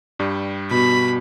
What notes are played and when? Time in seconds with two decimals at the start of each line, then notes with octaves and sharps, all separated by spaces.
0.19 G2 G3
0.71 B2 B5